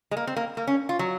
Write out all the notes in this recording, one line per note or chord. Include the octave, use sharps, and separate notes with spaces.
G#3
A#3
C4
A#3
A#3
C#4
F4
F#3